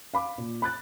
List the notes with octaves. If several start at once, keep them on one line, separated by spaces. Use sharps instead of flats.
F5 B5 D6
A#2
B5 F#6 A6